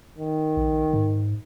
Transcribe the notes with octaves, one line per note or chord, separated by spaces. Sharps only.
D#3
A#1
G#2